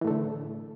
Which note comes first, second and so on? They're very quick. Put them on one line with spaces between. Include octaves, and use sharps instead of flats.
E3 A2 A3 D3